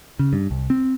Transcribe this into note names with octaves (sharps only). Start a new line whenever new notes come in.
C#3
G2
C2
C4